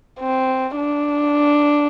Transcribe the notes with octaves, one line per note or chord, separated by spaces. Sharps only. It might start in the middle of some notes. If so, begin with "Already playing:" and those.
C4
D4